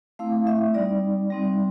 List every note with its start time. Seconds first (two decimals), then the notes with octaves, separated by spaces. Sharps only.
0.19 A3 C4 E4 F5
0.47 E5
0.74 G3 C4 D#4 D5
1.30 G3 C4 D#4